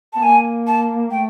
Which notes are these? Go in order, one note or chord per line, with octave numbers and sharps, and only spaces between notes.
B3 A5
A#3 G#5
A5
A3 G5